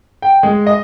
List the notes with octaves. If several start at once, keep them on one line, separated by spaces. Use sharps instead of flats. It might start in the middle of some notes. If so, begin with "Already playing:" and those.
G5
G#3
D#5